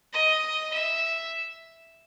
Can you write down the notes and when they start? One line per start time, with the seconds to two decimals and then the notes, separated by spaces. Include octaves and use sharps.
0.14 D#5
0.74 E5